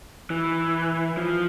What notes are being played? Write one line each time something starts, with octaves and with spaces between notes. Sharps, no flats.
E3
F3